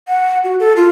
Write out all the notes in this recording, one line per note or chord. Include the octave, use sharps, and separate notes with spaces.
F#5
F#4
A4
F4